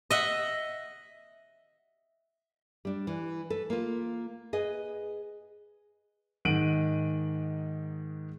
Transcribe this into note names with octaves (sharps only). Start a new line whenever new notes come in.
D#5 E5 F#5
G3 D4
E3
A4 B4
A#3 F4
G#4 B4 D#5
G#2 D#3 F#5 D7 D#7 F#7